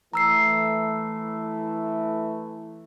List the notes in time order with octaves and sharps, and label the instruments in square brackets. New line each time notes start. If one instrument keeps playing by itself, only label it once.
[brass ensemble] E3 A3 [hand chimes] A#5 E6 C7